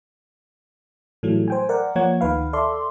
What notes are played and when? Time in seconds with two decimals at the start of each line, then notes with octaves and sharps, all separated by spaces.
1.23 A2 E3 F#3 G3 A3
1.48 C5 G5 G#5
1.69 A#4 D5 F#5
1.96 F3 A#3 C#5 F#5 G#6
2.21 D2 D#3 B4 F5
2.53 A4 D5 E5 C6